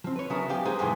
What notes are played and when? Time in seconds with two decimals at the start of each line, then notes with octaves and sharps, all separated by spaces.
0.04 F3 C4
0.16 B4 C#5
0.30 C#3 F#3 B3 D4 E4 A#4
0.49 F3 D4 G4 F5 G5 G#5
0.65 F#3 G#3 D#4 G#4 B4 C5
0.79 E2 G2 B2 F#3 G#3